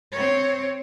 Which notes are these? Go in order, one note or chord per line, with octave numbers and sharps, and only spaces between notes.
C4 C#5